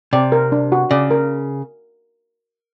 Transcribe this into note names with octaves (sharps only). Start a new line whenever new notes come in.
C3 D5
A#4
D4
F#4
C#3 D5
A#4